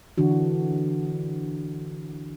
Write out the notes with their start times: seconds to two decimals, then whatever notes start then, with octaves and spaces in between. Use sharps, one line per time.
0.18 D3 E3 D4 F#4